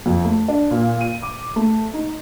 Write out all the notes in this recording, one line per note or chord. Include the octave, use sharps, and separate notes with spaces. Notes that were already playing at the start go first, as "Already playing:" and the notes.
F2
A3
D4
A#2
D#7
D6
A3
D#4